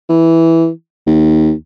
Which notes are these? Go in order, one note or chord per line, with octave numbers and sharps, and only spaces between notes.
E3
D#2